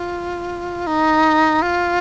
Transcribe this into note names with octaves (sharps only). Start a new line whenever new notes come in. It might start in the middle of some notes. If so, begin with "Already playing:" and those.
Already playing: F4
D#4
F4